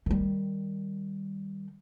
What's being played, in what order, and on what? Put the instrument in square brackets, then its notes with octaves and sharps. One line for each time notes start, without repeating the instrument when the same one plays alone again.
[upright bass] D#3 G3